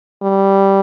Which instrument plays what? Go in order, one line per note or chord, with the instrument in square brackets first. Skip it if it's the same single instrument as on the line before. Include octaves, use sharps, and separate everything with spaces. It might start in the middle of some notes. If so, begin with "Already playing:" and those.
[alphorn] G3